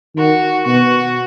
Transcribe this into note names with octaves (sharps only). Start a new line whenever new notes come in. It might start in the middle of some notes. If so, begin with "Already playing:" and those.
D#3 F#4
B2 F#4